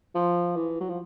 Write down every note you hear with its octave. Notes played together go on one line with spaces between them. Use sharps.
F3
E3
F#3
F3